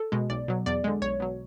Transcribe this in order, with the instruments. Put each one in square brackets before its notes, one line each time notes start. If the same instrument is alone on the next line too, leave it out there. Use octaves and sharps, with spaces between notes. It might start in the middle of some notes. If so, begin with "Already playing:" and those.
Already playing: [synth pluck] A4
B2 G#3
B1 D5
B2 F#3
E2 D5
D3 G#3
B1 C#5
B2 F#3